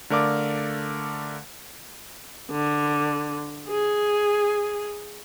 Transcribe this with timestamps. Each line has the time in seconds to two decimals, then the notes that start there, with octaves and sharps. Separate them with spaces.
0.10 D3 A3 A#4 D5 F5 D6
2.51 D3
3.69 G#4